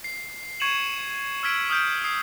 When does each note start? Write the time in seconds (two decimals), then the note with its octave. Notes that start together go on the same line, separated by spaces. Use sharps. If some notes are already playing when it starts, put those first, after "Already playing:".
0.04 C7
0.60 C#6 G#6 C#7 D#7 E7 F#7
1.43 E6 F6 G#6 B6 D7
1.70 D#6 F6 G6 D7
2.04 D#6 C7